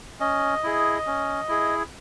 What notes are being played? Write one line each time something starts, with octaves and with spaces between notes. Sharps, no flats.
C#4 D#5
E4 G#4
C#4
E4 G#4